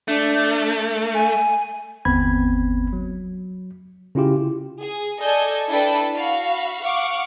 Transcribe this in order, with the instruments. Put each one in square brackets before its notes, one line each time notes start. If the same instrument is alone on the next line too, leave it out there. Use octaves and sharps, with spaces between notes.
[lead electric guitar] A3 [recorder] D4
[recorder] G#5
[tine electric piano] G1 D#2 B3 C4 B5 G#6
F#3
C#3 C#4 E4 F4 G4
[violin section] G#4
A4 D5 D#5 G#5 G6 G#6
D4 E4 A4 B4 G5 A5
F#4 F5 B5
F5 F#5 C#6 D6 F6